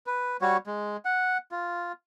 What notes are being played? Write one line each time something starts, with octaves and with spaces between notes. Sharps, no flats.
B4
G3 F#4 C#5
G#3
F#5
F4